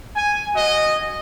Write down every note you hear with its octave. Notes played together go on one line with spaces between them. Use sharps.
G#5
F#4 D#5